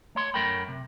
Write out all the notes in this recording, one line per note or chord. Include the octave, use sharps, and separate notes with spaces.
A3 C#5 C6
F#2 A3 A#4 C#5 G5 B5
C3